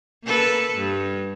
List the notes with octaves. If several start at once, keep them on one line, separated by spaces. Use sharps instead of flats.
A#3 A4 B4
G2